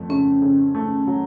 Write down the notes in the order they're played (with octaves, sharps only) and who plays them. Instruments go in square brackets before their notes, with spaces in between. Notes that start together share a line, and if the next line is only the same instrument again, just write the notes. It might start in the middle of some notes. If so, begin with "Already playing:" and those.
Already playing: [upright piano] F2 A3
[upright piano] C#3 [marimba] C#4
[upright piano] C#3
A3
F#3